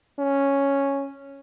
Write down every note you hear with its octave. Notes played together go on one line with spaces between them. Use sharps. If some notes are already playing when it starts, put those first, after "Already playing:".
C#4